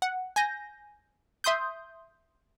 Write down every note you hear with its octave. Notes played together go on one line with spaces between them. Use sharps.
F#5
G#5 G6 A#6
E5 C6 D#6 G6